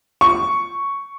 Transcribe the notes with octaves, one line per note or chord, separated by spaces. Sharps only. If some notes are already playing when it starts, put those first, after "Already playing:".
C#6